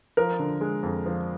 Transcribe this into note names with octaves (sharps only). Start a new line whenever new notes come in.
F3 A#4
D3
G#3
F2
F3